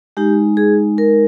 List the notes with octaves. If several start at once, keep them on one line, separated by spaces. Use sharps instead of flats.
G#3 D#4 G4
G#4
A#4